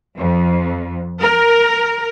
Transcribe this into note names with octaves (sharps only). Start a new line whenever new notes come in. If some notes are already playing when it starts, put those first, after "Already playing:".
F2
A#4